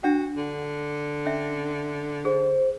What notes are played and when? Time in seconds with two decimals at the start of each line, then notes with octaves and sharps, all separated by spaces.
0.03 D4 F#4 F#5 G5
0.37 D3
1.26 C#4 E5
2.25 G#4 C5